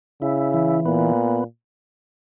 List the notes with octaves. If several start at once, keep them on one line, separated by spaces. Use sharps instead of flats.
C#3 E4
E3
A#2 B3